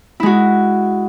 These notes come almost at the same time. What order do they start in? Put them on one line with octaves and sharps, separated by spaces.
E4 G#3 F#4